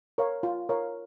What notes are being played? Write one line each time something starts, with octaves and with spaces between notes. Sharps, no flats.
A#4 C#5 F5
F4
A#4 C#5 F5